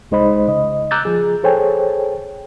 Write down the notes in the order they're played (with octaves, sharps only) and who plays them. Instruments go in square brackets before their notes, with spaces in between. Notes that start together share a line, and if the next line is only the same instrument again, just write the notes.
[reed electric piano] C2 G#3 D#4 C5 D#5 B5
C#3 D#5
A#5 D6 E6 F#6 G6 A6
F3 G#4
G#4 A4 C5 C#5 G5 G#5